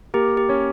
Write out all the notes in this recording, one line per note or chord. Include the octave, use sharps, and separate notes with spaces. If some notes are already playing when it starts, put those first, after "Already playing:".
A#3 G4 A#4
G4
C#4 C#5